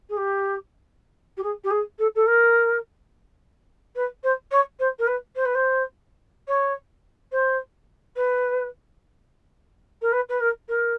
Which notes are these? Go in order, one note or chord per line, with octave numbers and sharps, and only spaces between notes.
G#4
G4
G4
G#4
G4
G#4
A4
A4
A#4
B4
C5
C#5
C5
A#4
B4
C5
B4
C5
C#5
C5
B4
A#4
B4
B4
A#4
A#4